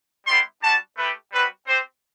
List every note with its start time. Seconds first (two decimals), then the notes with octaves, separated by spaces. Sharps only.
0.26 G3 B3 E4 G4 C6
0.62 G3 D4 F#4 A5
0.97 A3 E4 G4 B4
1.32 G3 C4 F#4 B4
1.67 C4 G4 C5